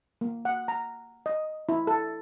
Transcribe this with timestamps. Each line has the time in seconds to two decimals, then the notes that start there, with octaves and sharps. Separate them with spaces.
0.21 A#3
0.45 F#5
0.68 A#5
1.26 D#5
1.69 E4
1.87 A4